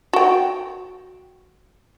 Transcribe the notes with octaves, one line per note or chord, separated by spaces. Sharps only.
F#4 G5